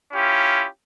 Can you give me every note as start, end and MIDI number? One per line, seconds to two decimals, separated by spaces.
0.13 0.66 61
0.13 0.66 64
0.13 0.66 65
0.13 0.66 67